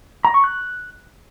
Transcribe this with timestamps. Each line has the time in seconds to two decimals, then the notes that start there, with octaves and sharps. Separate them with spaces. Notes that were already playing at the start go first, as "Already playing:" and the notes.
0.25 A#5
0.34 C#6
0.44 F#6